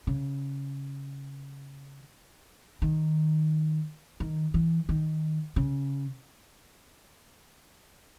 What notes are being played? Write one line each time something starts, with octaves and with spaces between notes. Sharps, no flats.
C#3
D#3
D#3
E3
D#3
C#3